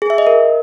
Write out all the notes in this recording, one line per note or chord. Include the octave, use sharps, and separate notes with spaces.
G#4
E5
D#5
A#4